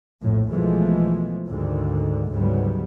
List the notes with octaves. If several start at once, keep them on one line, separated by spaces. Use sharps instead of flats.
A#1 F2 A2
B1 B2 E3 F3 G#3 A3
D2 G#2 D3 D#3
D2 G#2 C#3 F#3 G3 B3